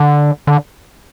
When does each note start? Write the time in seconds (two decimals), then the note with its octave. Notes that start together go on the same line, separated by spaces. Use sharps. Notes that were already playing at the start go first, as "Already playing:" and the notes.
Already playing: D3
0.47 D3